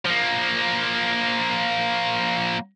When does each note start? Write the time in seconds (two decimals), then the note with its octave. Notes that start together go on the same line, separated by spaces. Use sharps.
0.05 F3 A#3